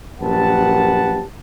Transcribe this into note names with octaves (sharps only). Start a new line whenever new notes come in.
A#1 F#2 G4 B4 F#5 A5